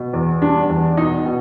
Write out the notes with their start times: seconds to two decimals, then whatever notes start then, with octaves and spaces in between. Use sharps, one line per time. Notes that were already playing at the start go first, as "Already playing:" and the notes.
Already playing: B2
0.13 E2
0.42 G3 D4
0.69 E2
0.97 B2 D#4
1.25 B2